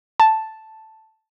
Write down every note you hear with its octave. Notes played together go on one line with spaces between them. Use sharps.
A5